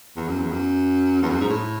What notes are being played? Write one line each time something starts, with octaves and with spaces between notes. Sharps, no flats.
E2
F#2
E2
F#2
E2
F#2
G#2
A2